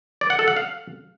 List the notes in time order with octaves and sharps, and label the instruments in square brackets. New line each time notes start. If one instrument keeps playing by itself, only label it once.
[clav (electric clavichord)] D5
F#5
A4
F#5
F5